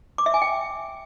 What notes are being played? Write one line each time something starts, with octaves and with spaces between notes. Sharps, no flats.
D6
E5
G#5
G5